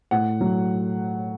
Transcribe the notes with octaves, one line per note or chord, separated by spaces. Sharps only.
A2 F#5
F#3